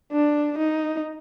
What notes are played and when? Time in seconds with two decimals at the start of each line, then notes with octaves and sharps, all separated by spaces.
0.13 D4
0.58 D#4